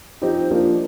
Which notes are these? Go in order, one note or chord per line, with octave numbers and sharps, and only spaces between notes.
F3 C4 D#4 G4
F3 A#3 D4